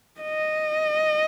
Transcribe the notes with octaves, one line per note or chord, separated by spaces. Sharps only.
D#5